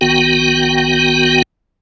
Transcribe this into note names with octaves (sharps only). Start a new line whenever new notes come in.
A#1 D#3 B3 F#4 G5